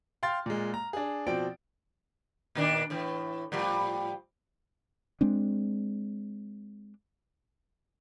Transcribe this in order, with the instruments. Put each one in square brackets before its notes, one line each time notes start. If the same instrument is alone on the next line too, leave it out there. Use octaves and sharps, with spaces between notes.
[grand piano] F5 G5 C6 F6 A6
A#2 G#3
A#5
D4 G#4
B2 F3 C4 D5 G5 D7
[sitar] A#2 D#3 D4
A2 E3
A2 F3 G3
[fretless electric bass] G#3 C4 D4